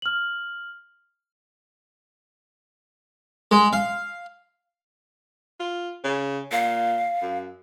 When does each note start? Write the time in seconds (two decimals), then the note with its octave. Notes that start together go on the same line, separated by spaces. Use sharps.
0.02 F6 F#7
3.51 G#3
3.73 F5
5.60 F4
6.04 C#3
6.52 A#2 F5
7.22 F#2